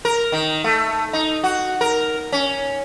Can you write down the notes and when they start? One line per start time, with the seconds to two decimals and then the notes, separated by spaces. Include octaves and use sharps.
0.05 A#4
0.32 D#3
0.64 A3
1.13 D#4
1.44 F#4
1.81 A#4
2.32 C#4